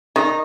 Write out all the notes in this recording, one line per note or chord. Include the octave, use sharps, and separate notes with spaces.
D#3 D#4